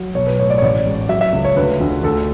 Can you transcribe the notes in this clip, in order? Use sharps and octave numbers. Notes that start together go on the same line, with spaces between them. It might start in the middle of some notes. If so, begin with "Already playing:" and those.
Already playing: F#3
B1 C#5
B4
A2 C#5
D5
C#5
A1 D5
G#2
F#3 E5
E5
C#2
C#5
D2 B4
D2
D2 A4